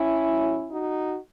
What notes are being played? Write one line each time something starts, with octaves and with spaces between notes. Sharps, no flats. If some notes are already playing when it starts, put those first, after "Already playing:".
Already playing: C#4 E4
A2 F#3
D#4 F#4